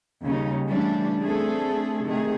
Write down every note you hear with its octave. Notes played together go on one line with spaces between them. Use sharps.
D#2 C#3 G3 C#4 D#4
C#3 E3 G3 A3 C#4 D4
A3 C4 D4 G#4 A4
C3 D#3 A3 G#4